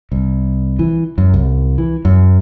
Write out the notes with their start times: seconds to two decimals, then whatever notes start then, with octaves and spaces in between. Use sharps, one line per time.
0.12 C2
0.79 E3
1.18 F#2
1.34 C2
1.78 E3
2.05 F#2